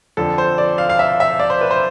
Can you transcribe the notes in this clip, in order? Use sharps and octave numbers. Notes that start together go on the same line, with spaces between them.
F2 D3 F3 A4
C5
D5
F5
F5
E5
E5
D5
C5
B4
C5